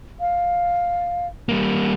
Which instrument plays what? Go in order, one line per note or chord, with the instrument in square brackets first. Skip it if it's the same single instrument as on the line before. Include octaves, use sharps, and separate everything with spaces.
[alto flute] F5
[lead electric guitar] G3 A#3